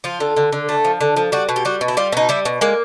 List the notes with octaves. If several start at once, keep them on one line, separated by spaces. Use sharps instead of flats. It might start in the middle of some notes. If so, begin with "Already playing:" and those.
F3 F4
D3
D3
D3
A3
F3
D3
F3
G3 F#4
B2
G4
G3 F#4
B2
E4
G3 F4
B2 D#4
G3 E4
B2
G#3 A#3